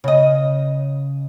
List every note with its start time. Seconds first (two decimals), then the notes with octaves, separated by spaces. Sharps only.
0.04 C#3 D#5